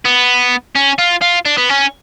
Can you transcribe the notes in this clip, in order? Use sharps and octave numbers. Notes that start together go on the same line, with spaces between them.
B3
C#4
F4
F4
D4
B3
C#4